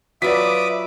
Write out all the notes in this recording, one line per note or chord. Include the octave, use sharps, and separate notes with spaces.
F#3 F4 B4 D5 E5 D6 D#6 B6